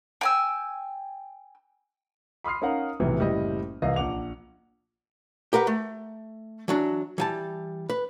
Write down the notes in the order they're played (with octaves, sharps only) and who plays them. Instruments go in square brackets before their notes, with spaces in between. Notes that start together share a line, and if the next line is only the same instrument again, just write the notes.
[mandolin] G5 G#5 E6
[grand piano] B5 C6 D#6 F6 C7
C#4 D#4 A#4 F5 F#5
B1 A2 C3 E3
F#1 A2 G3 E4 D#5
C2 E3 D#5 F5
A#1 F#5 D6 F7
[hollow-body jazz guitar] G4 A#4 B4 F#5
A3
E3 F#3 D4
E3 G3 A5
B4